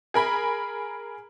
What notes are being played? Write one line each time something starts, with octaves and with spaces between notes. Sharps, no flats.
G#4 A#4 B5